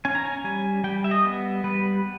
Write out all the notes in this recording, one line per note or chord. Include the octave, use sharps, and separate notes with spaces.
C#4 G#5
A#5
G#5
G3 G#5
G3 G5
E5
D#5
B3
G3 B4